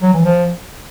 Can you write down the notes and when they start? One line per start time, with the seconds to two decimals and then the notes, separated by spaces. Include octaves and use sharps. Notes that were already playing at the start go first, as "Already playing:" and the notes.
0.02 F#3
0.14 E3
0.25 F3